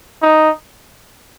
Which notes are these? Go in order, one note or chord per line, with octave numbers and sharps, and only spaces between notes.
D#4